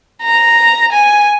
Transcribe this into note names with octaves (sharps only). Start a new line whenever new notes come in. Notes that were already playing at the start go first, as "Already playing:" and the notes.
A#5
G#5